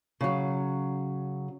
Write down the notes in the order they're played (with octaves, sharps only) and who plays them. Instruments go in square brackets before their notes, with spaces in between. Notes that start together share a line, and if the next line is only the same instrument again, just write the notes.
[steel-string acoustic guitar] C#3 F#3